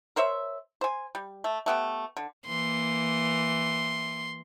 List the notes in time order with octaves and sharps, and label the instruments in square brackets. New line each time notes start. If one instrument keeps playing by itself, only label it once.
[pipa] A#4 C5 C#5 E5
C5 G#5
G3
A3
A3 B3 G4
D3
[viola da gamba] E3 A#3 [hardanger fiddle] C6